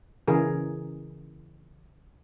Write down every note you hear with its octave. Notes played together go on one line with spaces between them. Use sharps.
C#3 E3 G#4 A#4